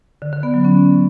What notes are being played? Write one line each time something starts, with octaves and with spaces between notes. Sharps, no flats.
D3
D3
B3
F#3
C#4